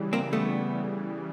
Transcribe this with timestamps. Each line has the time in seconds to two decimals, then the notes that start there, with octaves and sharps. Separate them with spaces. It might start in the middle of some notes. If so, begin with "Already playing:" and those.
Already playing: C#3 E3 G3
0.13 A#3 C4
0.33 A3 B3